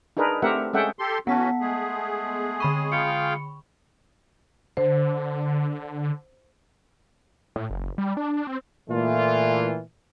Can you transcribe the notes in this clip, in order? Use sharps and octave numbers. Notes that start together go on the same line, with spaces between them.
D4 D#4 G#4 A#4 B4
A3 C4 G4 A#4 E5 F#5
G#3 C#4 A4 E5 F#5 G5
G4 A4 C6
E3 B3 C#4 F#4 F#5 A5 B6
G#3 A3 G#4
D3 B5 C#6 D#7
F4 F5 G5 C#7
D3 C5
A2
F#1
G3
D4
C4
A#2 E3 A3 F4